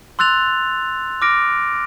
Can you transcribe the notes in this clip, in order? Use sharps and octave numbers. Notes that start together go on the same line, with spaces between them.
C6 E6 F#6 A6 F7
D6 F6 A#6 D7